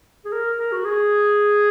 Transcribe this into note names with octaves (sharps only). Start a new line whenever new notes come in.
G#4
A#4
A#4
F#4
G#4